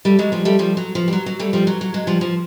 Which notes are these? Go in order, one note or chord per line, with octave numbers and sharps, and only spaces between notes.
G3 A3
F#3 G#3
F3 G3
G3 A3
F3 G3
F#3
F3
G3
F#3
F#3
G3 A3
F3 G3
F#3
F#3
F#3 G#3
F3 G3
F3